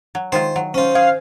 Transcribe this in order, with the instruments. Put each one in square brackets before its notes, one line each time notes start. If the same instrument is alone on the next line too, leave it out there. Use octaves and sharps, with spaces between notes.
[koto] F#3
[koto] D#3 G#3 F4 [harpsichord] C5
[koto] F#3
[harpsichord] C#4 F4 [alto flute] C5
[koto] G#4 [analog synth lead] F5